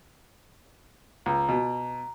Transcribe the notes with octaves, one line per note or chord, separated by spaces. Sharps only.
C#2 A#5
B2